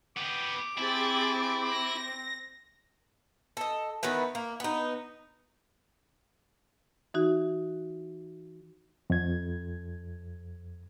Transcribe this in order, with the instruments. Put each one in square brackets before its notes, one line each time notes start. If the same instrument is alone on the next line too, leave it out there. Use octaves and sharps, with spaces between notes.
[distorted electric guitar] B3 G4 [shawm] D6
[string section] C4 [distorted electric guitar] E4 [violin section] G4 G#4 A6
[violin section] A#6
[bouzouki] A4 D#5
D#3 E3 B3 B4
A#3
B3 D#4
[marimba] E3 D#4 F#4
[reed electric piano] F2 G#6